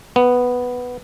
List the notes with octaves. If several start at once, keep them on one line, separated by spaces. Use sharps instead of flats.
B3